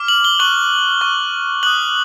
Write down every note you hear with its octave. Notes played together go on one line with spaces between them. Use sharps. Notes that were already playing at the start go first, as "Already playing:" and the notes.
Already playing: D6 F6
F#7
G7
C#6 F#6 F#7
C#6 F#6
D#6 F#6 F#7